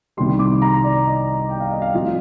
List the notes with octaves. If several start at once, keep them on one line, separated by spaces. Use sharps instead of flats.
C2 C3 D#3 G3 C6
D6
A#5
D5
D#5
G5
F5
D#5
F5
A2 F3 C4 F4 D#5